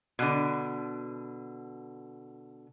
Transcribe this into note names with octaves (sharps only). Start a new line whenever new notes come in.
B2 D3